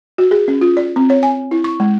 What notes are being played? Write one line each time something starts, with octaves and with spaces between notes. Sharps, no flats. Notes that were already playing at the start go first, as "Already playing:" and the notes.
F#4
G#4
C#4
F4
D5
C4
C#5
G#5
E4
C#6
G#3